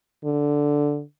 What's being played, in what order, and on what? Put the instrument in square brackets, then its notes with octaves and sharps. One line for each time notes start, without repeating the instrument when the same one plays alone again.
[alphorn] D3